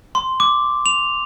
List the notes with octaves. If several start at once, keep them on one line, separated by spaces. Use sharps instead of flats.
C6
D6
F7